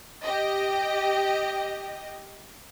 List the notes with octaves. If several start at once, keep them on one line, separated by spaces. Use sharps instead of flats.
G4 D#5